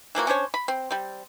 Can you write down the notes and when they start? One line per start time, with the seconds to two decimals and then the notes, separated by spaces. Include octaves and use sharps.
0.15 E3 F3 A#3 F#4
0.27 C#4 D4 C5 C#5
0.54 B5
0.68 C4
0.91 G3 C4